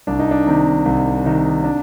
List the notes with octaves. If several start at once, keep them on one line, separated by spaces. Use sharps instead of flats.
C2 D4
D#4
D4
C3 D#3
C2
C3 D#3
D4